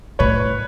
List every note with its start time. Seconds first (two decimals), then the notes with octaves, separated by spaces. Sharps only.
0.19 A2 B4 C#5